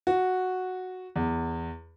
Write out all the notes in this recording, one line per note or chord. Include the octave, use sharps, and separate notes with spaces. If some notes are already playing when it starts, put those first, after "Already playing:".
F#4
E2